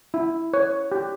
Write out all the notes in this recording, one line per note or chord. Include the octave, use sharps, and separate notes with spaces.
E4
C#5
G4